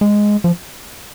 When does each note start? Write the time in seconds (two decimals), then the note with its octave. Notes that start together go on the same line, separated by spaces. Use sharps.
0.01 G#3
0.44 F3